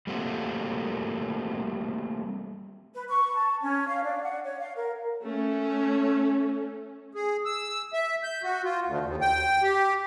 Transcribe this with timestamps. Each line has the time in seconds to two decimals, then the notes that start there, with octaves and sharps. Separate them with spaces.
0.07 G3 A3 A#3 C4 F4 F#4
2.95 B4
3.08 C#6
3.37 A5
3.62 C#4
3.88 F5
4.03 D4
4.23 F#5
4.44 C#5
4.59 F5
4.76 A#4
5.22 A3 C#4
7.14 G#4
7.45 E6
7.93 E5
8.23 G6
8.43 F#4
8.64 F4
8.86 D2
9.05 D#2
9.22 G5
9.63 G4